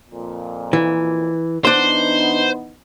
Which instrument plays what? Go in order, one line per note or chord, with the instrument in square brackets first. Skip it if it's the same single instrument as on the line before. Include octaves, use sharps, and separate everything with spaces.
[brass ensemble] F2 A#2
[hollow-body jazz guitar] E3
[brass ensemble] E3 B3 D#4 [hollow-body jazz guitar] D4 C6 [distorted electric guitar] C5